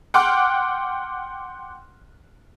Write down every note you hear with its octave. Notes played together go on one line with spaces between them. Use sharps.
F#5 G5 C6 D6 F6 F#6